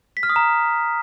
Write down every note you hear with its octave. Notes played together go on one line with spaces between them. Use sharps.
B6
F6
D#6
A#5